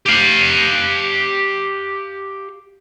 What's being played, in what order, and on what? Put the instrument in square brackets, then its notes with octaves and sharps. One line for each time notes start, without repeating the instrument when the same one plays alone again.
[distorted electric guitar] G4 F5